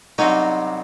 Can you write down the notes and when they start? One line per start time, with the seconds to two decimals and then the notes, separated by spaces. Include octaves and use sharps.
0.18 C2 C3 F#3 C#4 D#4 F#4